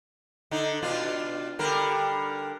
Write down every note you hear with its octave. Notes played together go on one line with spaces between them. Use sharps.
D3 D#4
B2 D4 F4
D3 G3 A#4